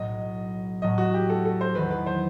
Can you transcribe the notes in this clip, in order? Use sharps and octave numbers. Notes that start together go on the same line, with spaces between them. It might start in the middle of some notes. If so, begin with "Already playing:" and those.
Already playing: B1 A2 F#3 D#5
A2 F#3 A3 D#5
F#4
G4
A4
A4
C5
E2 D#3 F#3 B4
B4
C5